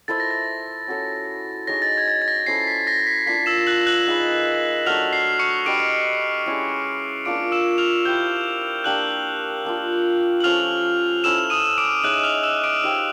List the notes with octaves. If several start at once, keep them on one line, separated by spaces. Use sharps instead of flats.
E4 A4 C5 E5 A6
A#6
A6
C#4 F#4 A4 C#5
D#4 G#4 C#5 A#6
A6
A#6
G#6
A6
A6
A#6
C#4 E4 A4 C5 C7
B6
A#6
B6
A#3 D4 F4 B6
E6 E7
F#6 F#7
F#6 F#7
A#3 D#4 G#4 B4
F#3 A3 D4 F6 F7
C7
C#6 C#7
D4 G4 B4 D#5 D6 D7
G#3 C#4 E4
A#3 D4 F4 D6 D7
E6 E7
F6 F7
E4 G4 C5 G6 G7
A#3 D4 G4 A#4 F#6 F#7
A#3 D4 F4
F#7
F3 A3 C#4 F6 F7
C#4 E4 A4 C5 E6 E7
D#6 D#7
D6 D7
D#4 G#4 C#5 E5 F#6 F#7
F6 F7
E6 E7
D6 D7
D#4 G4 C5 F5